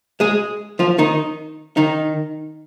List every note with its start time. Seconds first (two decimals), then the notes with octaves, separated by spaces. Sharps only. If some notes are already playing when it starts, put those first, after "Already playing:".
0.20 G#3 G#4
0.79 F3 F4
0.98 D#3 D#4
1.77 D#3 D#4